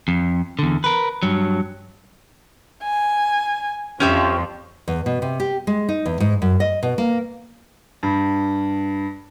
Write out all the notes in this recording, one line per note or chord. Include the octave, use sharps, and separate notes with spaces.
F2
E2 D3
A#4 B4
G2 F#3
G#5
F2 F3 C#4 G4 E5
E2
B2
C3
G4
G#3
D#4
E2
G#2
F#2
D#5
B2
A#3
G2